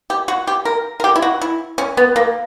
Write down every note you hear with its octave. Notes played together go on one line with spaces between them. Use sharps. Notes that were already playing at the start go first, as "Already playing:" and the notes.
G4
F#4
G4
A#4
A#4
G4
E4
F#4
E4
C#4
B3
A#3